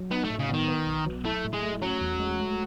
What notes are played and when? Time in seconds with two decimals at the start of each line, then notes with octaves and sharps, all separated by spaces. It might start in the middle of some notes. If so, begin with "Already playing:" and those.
Already playing: F#3
0.11 B3 D#4
0.24 A3
0.30 A2
0.39 C#3
0.49 D#3 B3
0.68 B3
0.87 B1
1.06 F#3
1.25 A3 E4
1.44 A2
1.54 G#3
1.63 A3
1.82 F#3 C#4
2.01 E2
2.20 G#3
2.39 A3